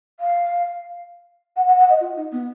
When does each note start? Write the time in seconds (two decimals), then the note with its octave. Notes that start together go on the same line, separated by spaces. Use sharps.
0.20 F5
1.56 F#5
1.67 F#5
1.78 F#5
1.89 D#5
2.00 F4
2.16 D#4
2.31 B3